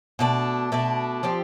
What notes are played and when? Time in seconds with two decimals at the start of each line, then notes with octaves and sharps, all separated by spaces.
0.19 B2 A3 D4
0.72 B2 A3 D4
1.23 F3 C4 G4 D5